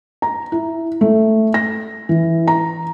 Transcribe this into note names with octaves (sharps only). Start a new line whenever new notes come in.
A#5
E4
A3
A#6
E3
A#5